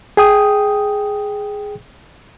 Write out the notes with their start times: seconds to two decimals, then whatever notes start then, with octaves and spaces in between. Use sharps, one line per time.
0.17 G#4 G5 D#6